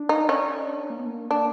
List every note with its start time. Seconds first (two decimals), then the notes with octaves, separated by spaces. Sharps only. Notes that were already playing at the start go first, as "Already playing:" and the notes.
Already playing: D4
0.09 D#4
0.29 C#4
0.49 D4
0.90 A#3
0.98 B3
1.06 A#3
1.31 A#3 D4